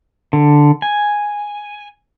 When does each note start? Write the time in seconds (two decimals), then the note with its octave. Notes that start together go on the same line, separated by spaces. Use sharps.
0.33 D3
0.82 G#5